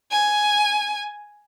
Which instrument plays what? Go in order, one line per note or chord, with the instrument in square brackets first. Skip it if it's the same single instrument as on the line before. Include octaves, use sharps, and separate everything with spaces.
[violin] G#5